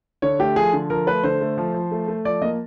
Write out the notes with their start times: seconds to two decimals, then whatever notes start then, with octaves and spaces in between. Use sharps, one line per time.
0.22 D3 C#5
0.39 A3 G4
0.56 F3 G#4
0.73 D3
0.90 F3 A#4
1.07 A3 B4
1.24 D3 C5
1.41 A3
1.58 F3
1.74 F3
1.91 A3
2.08 A3
2.25 F3 D5
2.42 A#3 D#5